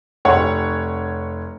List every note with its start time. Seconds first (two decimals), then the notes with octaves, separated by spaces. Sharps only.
0.25 F1 C#5 F#5